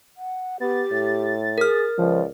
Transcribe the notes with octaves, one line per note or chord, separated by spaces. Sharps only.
F#5
B3 G4 A6
A2
G#4 A#4 F6
C#2 F3 D5